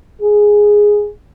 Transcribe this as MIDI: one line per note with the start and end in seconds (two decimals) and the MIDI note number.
0.22 1.09 68